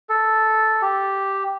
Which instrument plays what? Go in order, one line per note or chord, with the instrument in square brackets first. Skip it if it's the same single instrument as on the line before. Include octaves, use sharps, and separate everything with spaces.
[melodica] A4
G4